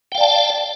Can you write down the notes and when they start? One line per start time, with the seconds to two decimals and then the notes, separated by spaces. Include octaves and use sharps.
0.12 G5
0.15 F5
0.18 D5
0.21 A5